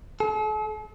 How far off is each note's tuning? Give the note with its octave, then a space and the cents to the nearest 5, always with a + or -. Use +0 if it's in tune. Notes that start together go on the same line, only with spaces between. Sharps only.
A4 -45